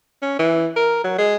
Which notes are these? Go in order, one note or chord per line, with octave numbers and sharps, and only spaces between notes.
C#4
E3
A#4
F#3
G#3